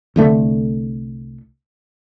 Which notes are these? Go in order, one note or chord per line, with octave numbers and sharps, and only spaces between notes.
C2 D3 A3